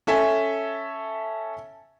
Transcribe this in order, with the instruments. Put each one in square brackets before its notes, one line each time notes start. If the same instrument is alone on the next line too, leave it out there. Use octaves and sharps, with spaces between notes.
[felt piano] C#4 A4 E5 G#5